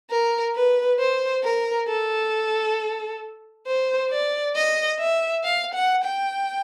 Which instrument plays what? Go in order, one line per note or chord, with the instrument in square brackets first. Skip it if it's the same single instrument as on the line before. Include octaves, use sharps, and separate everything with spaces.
[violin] A#4
B4
C5
A#4
A4
C5
D5
D#5
E5
F5
F#5
G5